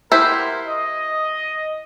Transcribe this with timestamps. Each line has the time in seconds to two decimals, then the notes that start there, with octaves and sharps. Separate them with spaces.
0.12 E4 G4 A#4 C5 F#5 C6
0.67 D#5